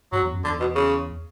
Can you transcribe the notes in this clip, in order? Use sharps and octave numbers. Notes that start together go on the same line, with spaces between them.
G2 F#3
E2
F#2
E2 D3
B2
C#3